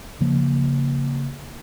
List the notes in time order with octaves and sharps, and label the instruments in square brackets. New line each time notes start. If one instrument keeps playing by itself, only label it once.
[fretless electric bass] C#3 F3 A#3